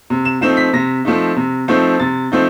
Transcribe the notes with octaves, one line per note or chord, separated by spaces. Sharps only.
C3
E7
F3 A3 C4 D#4 E7
B6
C3 A#6
F3 A3 C4 D#4
C3
F3 A3 C4 D#4
C3 A6
F3 A3 C4 D#4